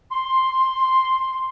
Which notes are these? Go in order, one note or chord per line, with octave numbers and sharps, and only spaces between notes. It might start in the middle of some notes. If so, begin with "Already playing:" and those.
C6